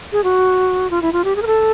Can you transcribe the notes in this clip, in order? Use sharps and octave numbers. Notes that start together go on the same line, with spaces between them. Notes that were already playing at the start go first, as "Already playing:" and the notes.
G#4
F#4
F4
E4
F4
G4
G#4
A#4
A4